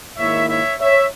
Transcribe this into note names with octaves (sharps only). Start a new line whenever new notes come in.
G#2 D#3 A#3 E4 C#5 E5
C#5 E5
C#5 E5